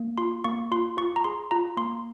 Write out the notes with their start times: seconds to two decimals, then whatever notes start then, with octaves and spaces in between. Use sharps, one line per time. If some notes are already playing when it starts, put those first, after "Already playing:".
Already playing: A#3
0.18 F4 C6
0.44 A#3 C#6
0.71 F4 C6
0.97 F4 C#6
1.16 A#5
1.24 G#4 C6
1.51 F4 A#5
1.77 A#3 C6